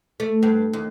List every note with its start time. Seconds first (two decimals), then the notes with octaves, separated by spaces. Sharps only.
0.20 A3
0.43 G2
0.73 D#2